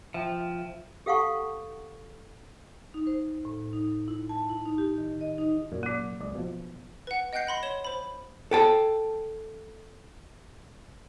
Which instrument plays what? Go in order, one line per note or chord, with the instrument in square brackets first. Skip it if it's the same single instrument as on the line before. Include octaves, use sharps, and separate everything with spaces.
[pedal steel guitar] F3 [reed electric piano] E5 G5
[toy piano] G4 A4 F5 F#5 A5 C#6
[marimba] D#4
C5
A2
D#4
E4
A5
E4
D#4
G4
D#3
D#5
D#4
[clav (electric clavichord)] F#2 A#2
[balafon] F#3 A#3
[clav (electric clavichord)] C#2 D5 D#5
B2 F3
[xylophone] B4 F#5
D#5 F#5 G5 F#6 G6 C7
F#5 B5 C6 A#6
C#5 E7 G7
C5 B5
[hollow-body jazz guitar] A4 G5 A5